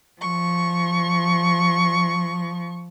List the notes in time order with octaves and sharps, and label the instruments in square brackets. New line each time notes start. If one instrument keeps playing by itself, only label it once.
[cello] F3 [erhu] C#6